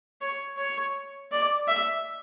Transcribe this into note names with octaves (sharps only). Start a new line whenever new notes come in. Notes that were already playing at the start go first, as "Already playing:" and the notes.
C#5
C#5
D5
E5